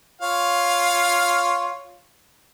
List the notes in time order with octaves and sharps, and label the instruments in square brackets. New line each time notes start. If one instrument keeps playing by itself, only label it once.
[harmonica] F4 C#5 F5